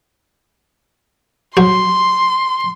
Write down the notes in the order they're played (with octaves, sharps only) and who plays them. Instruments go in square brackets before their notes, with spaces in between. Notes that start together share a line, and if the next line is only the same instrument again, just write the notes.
[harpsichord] F#3 F#4 C5 [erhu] C6